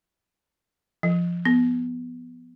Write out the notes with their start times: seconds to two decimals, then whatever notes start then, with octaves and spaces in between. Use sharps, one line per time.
1.03 F3
1.45 B3